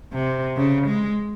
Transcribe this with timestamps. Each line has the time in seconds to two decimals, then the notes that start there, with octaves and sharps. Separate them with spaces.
0.13 C3
0.57 C#3
0.87 G#3